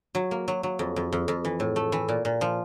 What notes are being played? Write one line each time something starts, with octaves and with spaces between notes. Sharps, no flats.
F#3
A#3
F#3
F#3
F2
F2
F2
F2
E3
A2
A3
E3
A#2
A#2
F3